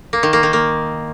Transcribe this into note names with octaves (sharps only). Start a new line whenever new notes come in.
A#3
D#3
A#3
D#3
A#3